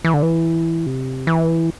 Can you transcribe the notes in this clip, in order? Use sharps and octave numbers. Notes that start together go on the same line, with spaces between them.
E3
D3
E3
C3
E3